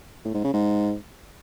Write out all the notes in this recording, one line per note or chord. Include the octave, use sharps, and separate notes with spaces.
A2
G#2
C#3
G#2